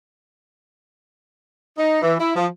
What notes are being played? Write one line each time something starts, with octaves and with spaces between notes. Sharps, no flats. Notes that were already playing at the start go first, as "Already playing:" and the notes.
D#4
E3
E4
F3